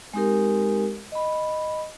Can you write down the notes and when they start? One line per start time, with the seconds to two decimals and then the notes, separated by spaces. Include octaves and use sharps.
0.14 G#3 C4 D#4 G4 A#4
1.12 D#5 B5